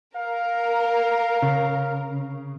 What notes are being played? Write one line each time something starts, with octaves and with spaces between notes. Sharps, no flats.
A#4 F5
C#3